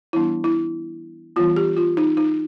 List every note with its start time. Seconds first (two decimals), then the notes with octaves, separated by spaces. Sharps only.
0.13 E3 G3 B3 D4 E4
0.44 E4
1.36 E3 G3 B3 F4
1.56 G4
1.77 F4
1.97 D#4
2.17 D#4